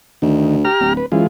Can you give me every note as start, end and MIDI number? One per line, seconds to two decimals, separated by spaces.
0.22 0.65 38
0.22 0.56 51
0.65 0.93 67
0.65 0.93 82
0.65 0.93 89
0.80 1.01 26
0.97 1.06 71
1.12 1.21 42
1.12 1.27 52
1.12 1.27 56
1.12 1.27 65